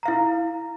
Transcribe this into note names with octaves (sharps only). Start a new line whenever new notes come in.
E4 F5 A#5